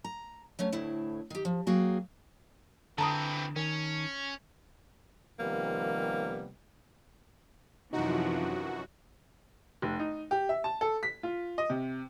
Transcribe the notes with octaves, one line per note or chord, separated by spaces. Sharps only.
A#5
F#3 A3 C#4
D2 A2 E4
D#3 G4
F3
F#3 A#3 F#4 G#4 F5 G5
D3 E3 C4 A5 A#5 D#6
D#3 C#4
C3 D#3 F3 G3 A#3 B3
F#2 C3 E3 F3 D#4 F#4
F1
D#4
G4
E5
A5
A4
B6
F4
D#5
C3